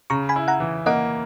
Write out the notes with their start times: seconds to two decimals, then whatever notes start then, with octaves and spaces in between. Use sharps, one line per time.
0.10 C#3 A#5 C#6
0.29 G#5 B5
0.36 E4
0.48 F#5 A#5
0.60 E3
0.86 A#3 D#5 F#5